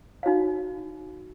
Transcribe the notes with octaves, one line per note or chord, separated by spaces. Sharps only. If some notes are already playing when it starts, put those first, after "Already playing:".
D#4 F#4 C#5 F5